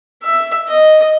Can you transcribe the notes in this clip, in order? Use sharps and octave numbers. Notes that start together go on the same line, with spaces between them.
E5
D#5